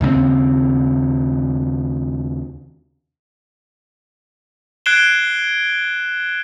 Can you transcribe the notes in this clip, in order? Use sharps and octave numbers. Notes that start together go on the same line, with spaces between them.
D#2 C#3 G#3 C4
F#6 G#6 C7 D7 E7 G7